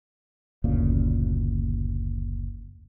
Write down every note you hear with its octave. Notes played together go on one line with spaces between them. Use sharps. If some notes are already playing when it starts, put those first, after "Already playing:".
F#1 D2 A#2 C#3